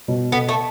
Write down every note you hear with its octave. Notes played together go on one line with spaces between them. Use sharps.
B2
B3 A4
A3